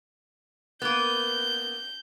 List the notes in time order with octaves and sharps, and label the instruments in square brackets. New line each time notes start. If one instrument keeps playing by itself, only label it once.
[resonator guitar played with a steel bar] A#3 B3 [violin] G6